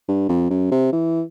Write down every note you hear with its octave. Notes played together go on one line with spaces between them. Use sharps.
G2
F2
F#2
C3
E3